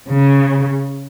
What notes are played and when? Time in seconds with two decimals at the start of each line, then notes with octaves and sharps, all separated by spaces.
0.09 C#3